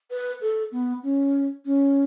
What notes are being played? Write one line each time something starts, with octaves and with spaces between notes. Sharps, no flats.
B4
A4
B3
C#4
C#4